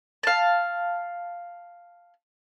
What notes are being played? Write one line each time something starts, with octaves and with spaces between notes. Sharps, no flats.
F5 A5